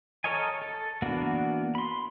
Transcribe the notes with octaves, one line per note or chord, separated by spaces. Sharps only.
A4 A#4 C#5 D#5 G#5
A4
E3 A#3 B3 D4 F#4
B5 C6